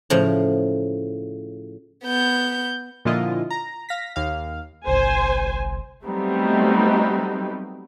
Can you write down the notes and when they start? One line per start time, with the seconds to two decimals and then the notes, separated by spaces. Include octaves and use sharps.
0.10 A2 C#3 F3
2.04 B3 G6
3.05 A#2 D3 F3 E4 F4 D#5
3.50 A#5
3.89 F5 A#6 B6
4.16 D#2 F5
4.87 G1 C2 C5 G#5
6.04 F#3 G3 A3 B3 C4 D#4